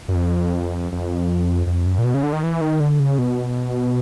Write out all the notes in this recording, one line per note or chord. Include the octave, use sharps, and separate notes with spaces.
F#2
F2
F2
F2
F#2
A#2
B2
C#3
D3
D#3
E3
D#3
D3
C#3
B2